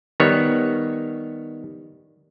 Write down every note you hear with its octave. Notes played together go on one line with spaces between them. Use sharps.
D#3 G3 B3 C#5